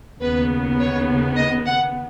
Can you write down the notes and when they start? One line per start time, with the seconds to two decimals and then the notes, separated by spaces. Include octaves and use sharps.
0.21 D#2 C#3 B3 B4
0.79 C#5
1.36 D#5
1.66 F#5